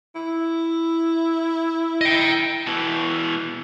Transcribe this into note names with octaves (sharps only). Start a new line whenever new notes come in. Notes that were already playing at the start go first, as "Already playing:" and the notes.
E4
D#5 G5
B2 E3